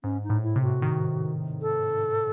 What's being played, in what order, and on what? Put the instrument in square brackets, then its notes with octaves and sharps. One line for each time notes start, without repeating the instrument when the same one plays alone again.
[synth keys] G#2 [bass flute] C#4
[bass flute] D#4
[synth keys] A2
[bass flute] E4
[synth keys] C3
[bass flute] F#4
[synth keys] D#3
[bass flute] A4